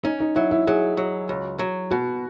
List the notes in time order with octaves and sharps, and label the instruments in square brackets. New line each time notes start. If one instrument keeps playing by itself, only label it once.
[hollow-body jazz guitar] C#4 [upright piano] D#4
[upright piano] D#4
[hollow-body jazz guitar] F#3 [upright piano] E4
[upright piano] E4
[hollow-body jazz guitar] F#3 [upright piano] G#4
[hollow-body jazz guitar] F#3
C#2
F#3
[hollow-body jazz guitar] B2 [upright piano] F#4